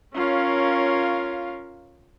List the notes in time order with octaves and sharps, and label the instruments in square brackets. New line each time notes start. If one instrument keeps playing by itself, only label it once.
[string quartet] C#4 A#4 C#5 [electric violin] F4 F5